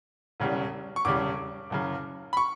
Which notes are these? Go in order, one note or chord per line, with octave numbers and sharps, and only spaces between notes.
E1 E2 C#3 G3
C#6
E1 E2 C#3 G3 D6
F#1 F#2 C#3
B5
C#6